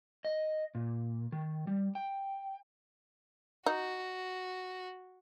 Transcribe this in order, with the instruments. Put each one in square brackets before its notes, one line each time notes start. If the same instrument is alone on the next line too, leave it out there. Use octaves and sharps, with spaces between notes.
[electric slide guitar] D#5
A#2
D#3
G3
G5
[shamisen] D#4 [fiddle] F#4